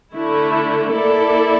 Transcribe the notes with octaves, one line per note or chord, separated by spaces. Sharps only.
D3 A3 E4
A#3 E4 A4 D5